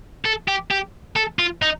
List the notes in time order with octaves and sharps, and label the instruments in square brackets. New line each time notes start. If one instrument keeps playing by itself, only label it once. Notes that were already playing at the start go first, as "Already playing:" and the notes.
[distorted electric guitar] A4
G4
G4
A4
F4
D#4